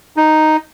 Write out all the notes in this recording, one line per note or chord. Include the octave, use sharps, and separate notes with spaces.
D#4